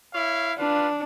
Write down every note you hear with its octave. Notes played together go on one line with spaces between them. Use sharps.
E4 C#5 F5
D4 F4 B4 F5